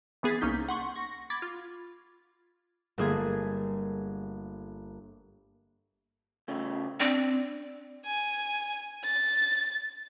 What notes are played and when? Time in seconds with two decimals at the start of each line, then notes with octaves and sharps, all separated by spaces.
0.23 E3 B3 G#4 A6 B6
0.41 C2 A#3 C#4 D#4 G6 B6
0.69 F#5 C6 C#6
0.96 C#6 A#6
1.30 B5 D6 G#6 A6
1.42 F4
2.98 G1 A3 A#3 G#4
6.48 A2 C#3 A3
7.00 C4 D4
8.06 G#5
9.04 A6